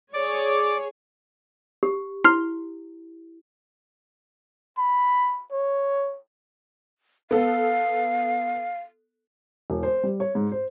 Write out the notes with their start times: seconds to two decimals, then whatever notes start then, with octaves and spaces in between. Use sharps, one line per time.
0.14 G#4 C#5 D5 D6
1.83 G4
2.24 E4 C6 F6
4.78 B5
5.52 C#5
7.31 B3 A4 F5
9.70 E1
9.83 C5
10.04 G3
10.20 C#5
10.35 G#2
10.52 C5